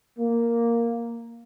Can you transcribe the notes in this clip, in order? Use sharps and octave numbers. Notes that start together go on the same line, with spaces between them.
A#3